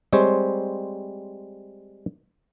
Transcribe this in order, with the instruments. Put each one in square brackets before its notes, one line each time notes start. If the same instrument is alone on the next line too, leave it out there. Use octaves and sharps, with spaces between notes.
[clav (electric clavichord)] G3 G#3 C4 C5 C#5